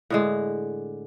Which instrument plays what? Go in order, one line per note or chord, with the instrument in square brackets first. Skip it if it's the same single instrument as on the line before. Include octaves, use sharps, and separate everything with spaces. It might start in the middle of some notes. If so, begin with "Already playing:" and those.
[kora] A2 D3 G#3